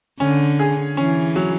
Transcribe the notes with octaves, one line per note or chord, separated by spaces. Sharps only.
D3 C#4
G#4
E3 C#4
F#3